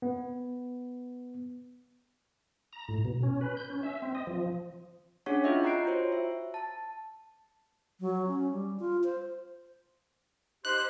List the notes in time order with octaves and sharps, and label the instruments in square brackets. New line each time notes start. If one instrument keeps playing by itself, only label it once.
[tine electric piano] B3
[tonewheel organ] A#5
A2
B2
C#4
B4
G6
C#4
E5
C4
D#5
F3
[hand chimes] C#4 D4 G#4 C#5 F#5 C#6
E4 F4 D#5 E5
G5 A#5 F#6 C7 D7
F4 F#4 C5 C#5
E5
A5
[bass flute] F#3
C#4
G3
F4
C5
[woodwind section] D#4 G4 C5 [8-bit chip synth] F#6